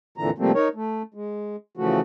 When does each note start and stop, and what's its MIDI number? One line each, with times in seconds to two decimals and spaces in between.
0.18 0.30 41
0.18 0.30 46
0.18 0.30 50
0.18 0.30 52
0.18 0.30 82
0.38 0.52 48
0.38 0.52 53
0.38 0.52 55
0.38 0.52 57
0.38 0.52 58
0.38 0.52 60
0.55 0.68 63
0.55 0.68 70
0.55 0.68 73
0.75 1.02 57
1.14 1.56 56
1.77 2.00 49
1.77 2.00 52
1.77 2.00 53
1.77 2.00 57
1.77 2.00 66